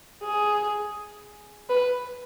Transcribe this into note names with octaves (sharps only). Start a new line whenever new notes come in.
G#4
B4